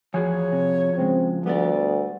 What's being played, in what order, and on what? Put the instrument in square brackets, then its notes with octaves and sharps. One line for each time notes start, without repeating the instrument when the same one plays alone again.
[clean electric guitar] E2 G#5 [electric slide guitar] F3 F#4 G#4 [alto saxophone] C#5
[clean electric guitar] C3
[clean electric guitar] C#2 C#3 G#3 [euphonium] C4
[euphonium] D2 [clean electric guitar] G3 A4 D5 [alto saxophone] B3